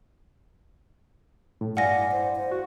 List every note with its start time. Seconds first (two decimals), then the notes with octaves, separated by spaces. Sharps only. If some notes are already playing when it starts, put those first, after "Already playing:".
1.61 A2
1.77 G2 E4 D5 F5 F#5 G#5 A#6
2.12 C5
2.36 C5
2.52 F#4